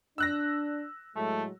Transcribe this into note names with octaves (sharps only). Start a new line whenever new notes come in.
D4 E6 F#6 A#6
A2 F#3 G#3 A3